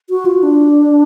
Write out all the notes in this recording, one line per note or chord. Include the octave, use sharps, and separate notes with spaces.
F#4
F4
D4